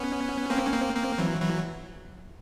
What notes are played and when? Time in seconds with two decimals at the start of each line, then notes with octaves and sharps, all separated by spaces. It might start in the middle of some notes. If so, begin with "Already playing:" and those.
Already playing: B3 C#4
0.50 A#3 C4
0.66 C#4
0.73 A#3 C4
0.95 A#3 C4
1.18 E3 F#3
1.41 E3 F#3